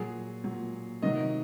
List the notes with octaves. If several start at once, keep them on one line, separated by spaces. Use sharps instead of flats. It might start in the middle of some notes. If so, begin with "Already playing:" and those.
Already playing: A#2 F#3 G#4
A#2 F#3
C3 D#3 F#3 D#5